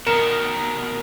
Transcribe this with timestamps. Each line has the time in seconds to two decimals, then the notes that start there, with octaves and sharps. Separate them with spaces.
0.07 B2 D#3 A#4 C#7 E7